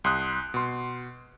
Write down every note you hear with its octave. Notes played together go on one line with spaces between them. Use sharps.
C2 C6 D#6 F#6
B2 C6